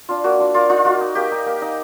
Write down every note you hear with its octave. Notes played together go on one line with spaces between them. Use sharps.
D4 F4
A#3 F#4
D4 F4
A#3 F4
D#4 F4
A#3 F#4
D#4
A#3 G4
D#4
A#3
D#4